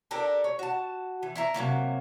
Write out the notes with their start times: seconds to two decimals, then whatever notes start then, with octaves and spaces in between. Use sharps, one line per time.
0.11 D4 G4 A4 A#4
0.44 C#5
0.59 F#4 A5
1.23 E3
1.35 E4 E5 A#5
1.54 C3 D#3 F#3 A#3